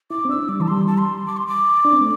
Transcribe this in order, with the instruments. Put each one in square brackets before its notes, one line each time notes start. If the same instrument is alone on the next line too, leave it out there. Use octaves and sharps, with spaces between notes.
[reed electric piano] E4 [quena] D6
[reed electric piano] C4
[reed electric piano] D4 [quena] E6
[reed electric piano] G3 [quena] D6
[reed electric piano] E3 [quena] A5
[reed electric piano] G3 [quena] C6
[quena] A5
C6
D6
C6
D6
[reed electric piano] D4
C4
A3